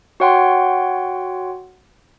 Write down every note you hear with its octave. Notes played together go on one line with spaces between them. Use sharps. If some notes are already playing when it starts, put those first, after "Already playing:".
F#4 C#5 F#5 G5 C6